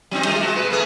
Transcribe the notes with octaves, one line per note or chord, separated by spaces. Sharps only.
F#3 C4 D#4
G3 A3 F4
G#3 F#4
B2 B4
A3 B3 G#4